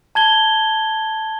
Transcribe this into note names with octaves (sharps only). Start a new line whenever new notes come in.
A5 G#6 G7